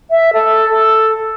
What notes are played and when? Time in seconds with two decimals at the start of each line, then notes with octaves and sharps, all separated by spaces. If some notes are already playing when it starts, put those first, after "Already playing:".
0.11 E5
0.33 A4
0.70 A4